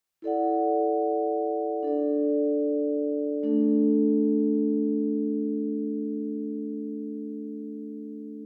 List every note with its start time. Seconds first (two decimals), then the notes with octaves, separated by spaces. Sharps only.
0.22 E4 A4 D5 F#5
1.83 D4 A4 D5
3.43 A3 D4 A4